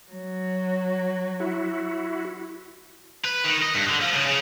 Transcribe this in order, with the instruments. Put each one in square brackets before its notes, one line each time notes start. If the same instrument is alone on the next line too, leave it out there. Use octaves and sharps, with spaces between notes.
[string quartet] F#3
[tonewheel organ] E4 F#4
[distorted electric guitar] B4
D#3
D#5
G2
D3
F3
C#3
C#3